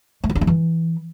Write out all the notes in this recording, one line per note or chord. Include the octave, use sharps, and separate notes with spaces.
A3
F4
D4
A#3
E3